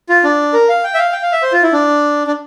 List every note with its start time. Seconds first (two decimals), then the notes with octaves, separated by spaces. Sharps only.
0.09 F4
0.24 D4
0.53 A#4
0.69 F5
0.84 G5
0.94 E5
0.98 F5
1.13 G5
1.23 F5
1.32 E5
1.42 C5
1.53 F4
1.63 E4
1.73 D4
2.27 D4